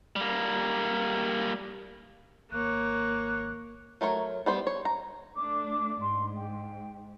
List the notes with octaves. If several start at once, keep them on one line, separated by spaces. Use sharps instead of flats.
G3 A#3
G#1 A#3 C#5 F#6
F#3 A3 A#4 C#5
G3 B3 C5
C#5
A#5
A3 D4 D6
G#2 C6
G5